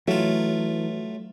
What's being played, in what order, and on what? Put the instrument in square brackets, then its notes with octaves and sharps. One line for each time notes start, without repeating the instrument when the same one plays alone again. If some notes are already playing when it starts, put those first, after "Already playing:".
[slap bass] E3 [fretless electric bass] F#3 [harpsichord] A3 F4